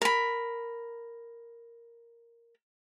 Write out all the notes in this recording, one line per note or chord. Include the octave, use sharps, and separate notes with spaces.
A#4 B5